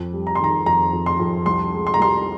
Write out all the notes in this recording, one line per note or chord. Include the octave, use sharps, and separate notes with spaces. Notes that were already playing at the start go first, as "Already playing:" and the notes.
Already playing: F2
G3
A#5
C6
D#3 A#5
F2 A#5
F2
C6
F2
C2 C6
G#3
C6
A#5
C2 C6